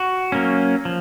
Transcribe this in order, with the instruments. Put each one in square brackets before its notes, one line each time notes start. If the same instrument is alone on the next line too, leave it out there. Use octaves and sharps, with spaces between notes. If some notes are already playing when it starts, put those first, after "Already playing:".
Already playing: [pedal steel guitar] F#4
F#3 A#3 C#4
F3